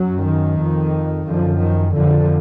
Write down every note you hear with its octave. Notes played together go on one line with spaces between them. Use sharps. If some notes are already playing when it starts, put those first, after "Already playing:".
Already playing: F#2 F#3
D#3
F2
F#2 D3 F3
D#3
F2 D3 F3